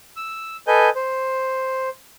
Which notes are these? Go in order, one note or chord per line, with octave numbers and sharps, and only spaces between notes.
E6
A4 B4 D#5 G#5 G6
C5